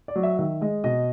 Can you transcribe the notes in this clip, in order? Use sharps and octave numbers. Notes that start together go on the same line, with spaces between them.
D5
F#3
E5
D#3 E5
G#3 D#5
B2 D#5